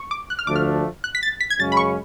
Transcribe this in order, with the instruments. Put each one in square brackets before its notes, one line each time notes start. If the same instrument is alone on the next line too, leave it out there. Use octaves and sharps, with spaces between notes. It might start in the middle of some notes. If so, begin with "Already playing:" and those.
Already playing: [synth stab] C#6
D6
F#6
F6
[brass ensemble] D2 D3 F3 A3 D4 [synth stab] D6
[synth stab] F6
F#6
B6
A6
B6
G#6
[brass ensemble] F#2 C#3 G#3 C#4 [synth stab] A6
[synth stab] B5
C#6